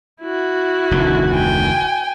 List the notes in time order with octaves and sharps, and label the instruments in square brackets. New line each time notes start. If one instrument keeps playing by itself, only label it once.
[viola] E4 F#4
[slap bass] F1 D2 D#3
[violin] G5 G#5